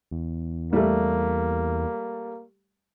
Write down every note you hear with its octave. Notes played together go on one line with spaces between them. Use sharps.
E2
G3 A3 A#3